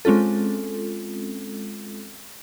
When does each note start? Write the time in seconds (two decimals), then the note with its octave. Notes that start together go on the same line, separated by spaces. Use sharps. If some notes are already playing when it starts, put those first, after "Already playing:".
0.05 G#3 C4 C#4 F4 A4